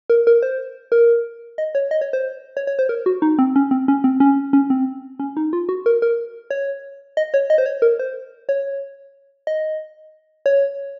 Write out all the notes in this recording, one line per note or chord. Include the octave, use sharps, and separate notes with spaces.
A#4
A#4
C5
A#4
D#5
C#5
D#5
C#5
C5
C#5
C#5
C5
A#4
F#4
D#4
C4
C#4
C4
C#4
C4
C#4
C#4
C4
C#4
D#4
F4
F#4
A#4
A#4
C#5
D#5
C#5
D#5
C5
C#5
A#4
C5
C#5
D#5
C#5